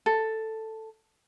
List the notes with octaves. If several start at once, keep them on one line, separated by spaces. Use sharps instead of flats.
A4